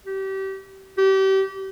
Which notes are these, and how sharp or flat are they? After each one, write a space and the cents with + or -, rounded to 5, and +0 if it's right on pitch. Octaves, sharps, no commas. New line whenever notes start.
G4 -30
G4 -30